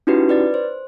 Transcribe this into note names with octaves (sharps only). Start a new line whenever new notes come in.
C#4 D#4 E4 F#4 G4 B4
B4 D5 A6
C5